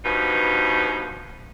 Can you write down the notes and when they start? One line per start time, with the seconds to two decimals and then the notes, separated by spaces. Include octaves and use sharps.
0.05 G2 B2 F3 D#4